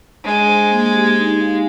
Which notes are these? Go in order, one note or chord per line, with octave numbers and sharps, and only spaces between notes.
G#3 D4
C5
A#3
G4
D#4
F5